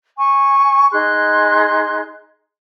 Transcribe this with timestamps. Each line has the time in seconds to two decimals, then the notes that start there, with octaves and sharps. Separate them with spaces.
0.18 G#5 C#6
0.92 D#4 G#4 C6 F#6